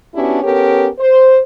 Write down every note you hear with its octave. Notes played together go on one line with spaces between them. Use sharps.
B3 C#4 D4 E4 F#4 G4
B3 C#4 G4 A4 A#4 C#5
C5